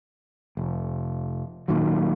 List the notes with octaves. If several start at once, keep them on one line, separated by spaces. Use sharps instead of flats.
F1
A#2 D#3 F#3